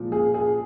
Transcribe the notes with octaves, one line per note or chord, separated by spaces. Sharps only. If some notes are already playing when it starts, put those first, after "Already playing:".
Already playing: A#2 F3 G#3
G#4
G#4